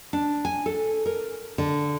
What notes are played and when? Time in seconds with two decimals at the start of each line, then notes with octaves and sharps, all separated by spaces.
0.13 D4
0.45 G#5
0.66 A4
1.06 A#4
1.58 D3